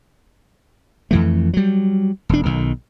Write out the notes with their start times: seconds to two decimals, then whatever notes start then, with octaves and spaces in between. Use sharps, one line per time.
1.11 F2 E3 A3
1.53 F#3 G3
2.29 E1 D4
2.45 B1 D#3